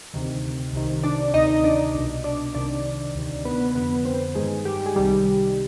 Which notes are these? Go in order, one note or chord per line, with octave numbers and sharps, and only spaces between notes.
D2 C3 D#3
C2 C3 D#3
D4 D5
D2 C3 D#3 D#4 D#5
D#5
D4 D5
C2 B2
D4 D5
C2 C3 D#3 D4 D5
D2 C3 D#3
B3 B4
B3 B4
F2 D3 B3 B4
C4 C5
G2 D#3 G#3 G#4
G3 G4
G#4
C2 C3 D#3 G3 G4